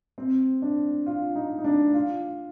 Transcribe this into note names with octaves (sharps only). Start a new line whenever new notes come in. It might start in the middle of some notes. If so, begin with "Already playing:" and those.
C4
D4
F4
D#4
D#4
D4
F4